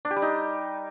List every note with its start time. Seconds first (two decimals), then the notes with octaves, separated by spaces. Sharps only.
0.05 D4
0.11 G4
0.16 G3
0.22 D#4